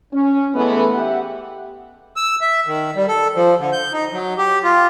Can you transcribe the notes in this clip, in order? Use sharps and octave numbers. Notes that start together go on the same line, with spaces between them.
C#4
E3 G#3 A3 B3
G4 E5 F#5
E6
E5
D#3
G3
A4
F3
D3
G6
D#4
F#3
G4
F4